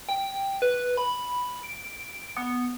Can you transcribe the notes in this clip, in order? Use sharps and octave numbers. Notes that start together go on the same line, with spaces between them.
G5
B4
B5
D7
B3